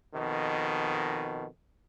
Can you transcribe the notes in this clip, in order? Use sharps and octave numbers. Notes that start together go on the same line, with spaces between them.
F2 B2 D#3